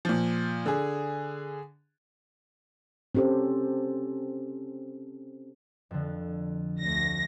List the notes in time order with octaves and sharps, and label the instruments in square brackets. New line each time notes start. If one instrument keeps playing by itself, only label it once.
[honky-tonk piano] A#2 F3
D3 G#4
[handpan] C4 C#4 G4 A4 C5
[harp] F2 D3
[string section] D2 A#6